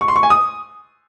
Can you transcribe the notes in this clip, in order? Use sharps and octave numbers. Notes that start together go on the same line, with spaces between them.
C#6
C6
C#6
G#5
D#6